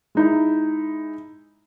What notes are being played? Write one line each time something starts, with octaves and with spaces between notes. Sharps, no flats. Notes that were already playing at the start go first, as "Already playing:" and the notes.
G#3 D#4 E4